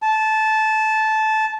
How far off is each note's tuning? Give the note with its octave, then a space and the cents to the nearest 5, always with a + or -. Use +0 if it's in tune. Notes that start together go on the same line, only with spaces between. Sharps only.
A5 -15